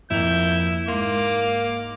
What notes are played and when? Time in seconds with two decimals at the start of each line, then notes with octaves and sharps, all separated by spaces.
0.11 F2 A#3 E4 G6 F7
0.88 G#2 A#3 C6 D6